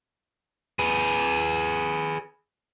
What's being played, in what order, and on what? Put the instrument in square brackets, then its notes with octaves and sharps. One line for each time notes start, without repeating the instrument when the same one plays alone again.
[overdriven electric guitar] G#4 B4